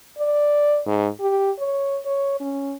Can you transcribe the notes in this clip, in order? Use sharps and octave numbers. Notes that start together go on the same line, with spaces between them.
D5
G#2
G4
C#5
C#5
C#4